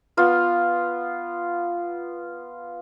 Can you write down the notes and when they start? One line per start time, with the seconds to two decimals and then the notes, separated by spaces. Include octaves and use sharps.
0.17 B3 F4